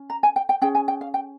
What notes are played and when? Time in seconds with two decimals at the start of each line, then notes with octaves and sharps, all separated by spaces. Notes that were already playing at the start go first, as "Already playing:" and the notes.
Already playing: C#4
0.10 A#5
0.23 G#5
0.36 G5
0.49 G5
0.62 C#4 G#4 G5
0.75 G#5
0.88 G5
1.01 F5
1.14 G5